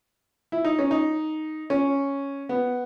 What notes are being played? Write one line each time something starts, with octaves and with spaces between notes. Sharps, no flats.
E4
D#4
C#4
D#4
C#4
B3